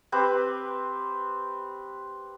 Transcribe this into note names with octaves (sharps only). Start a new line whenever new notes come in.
C4 G4 B4 C5